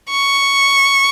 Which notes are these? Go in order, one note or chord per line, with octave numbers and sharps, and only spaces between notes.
C#6